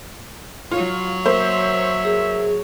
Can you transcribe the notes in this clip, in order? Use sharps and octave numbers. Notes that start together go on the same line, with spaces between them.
F#3 F4 C#5
A#3 C5 E5
G#4